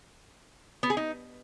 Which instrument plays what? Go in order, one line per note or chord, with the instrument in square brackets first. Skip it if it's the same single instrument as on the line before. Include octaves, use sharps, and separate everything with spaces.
[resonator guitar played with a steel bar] B3
G#4
D#4